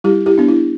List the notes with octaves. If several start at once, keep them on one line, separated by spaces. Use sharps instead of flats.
G3 E4 G4
E4 G4
B3 D4
E4